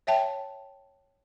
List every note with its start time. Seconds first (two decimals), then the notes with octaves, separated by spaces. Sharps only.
0.07 C#5 E5 G5 A5